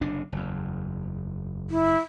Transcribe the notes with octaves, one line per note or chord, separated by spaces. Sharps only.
F#1 C3 D4
F#1 E2
E4